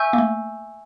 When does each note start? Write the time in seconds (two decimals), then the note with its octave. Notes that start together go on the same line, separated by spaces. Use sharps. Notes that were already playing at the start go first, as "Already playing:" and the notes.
Already playing: E5 G#5 C#6 E6 G6
0.13 A#3
0.18 A3